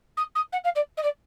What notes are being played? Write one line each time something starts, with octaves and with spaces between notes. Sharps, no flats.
D#6
D#6
F#5
F5
D5
D#5
D5